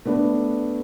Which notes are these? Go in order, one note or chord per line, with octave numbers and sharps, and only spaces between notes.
A3 B3 D4 B4